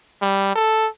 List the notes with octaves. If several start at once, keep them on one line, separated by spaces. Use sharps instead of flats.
G3
A4